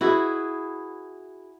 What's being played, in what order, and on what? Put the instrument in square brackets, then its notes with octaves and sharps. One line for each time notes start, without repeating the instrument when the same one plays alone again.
[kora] E4 F#4 G#4 B4